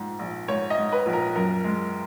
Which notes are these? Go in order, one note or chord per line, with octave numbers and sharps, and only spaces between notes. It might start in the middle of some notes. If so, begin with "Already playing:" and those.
Already playing: A#1 G#2
A#1
G#2 C#5
D#5
G#2
B4
A#1
A#4
F#2 A#4
G#3